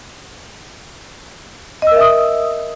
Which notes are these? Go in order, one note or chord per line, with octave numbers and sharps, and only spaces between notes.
A#4 D#5 E5 D#6 E6